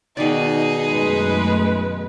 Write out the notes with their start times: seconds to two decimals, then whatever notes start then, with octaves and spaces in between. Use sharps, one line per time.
0.17 B2 D#3 D#4 G#4 D5
0.88 F#2 G#3 A3 B4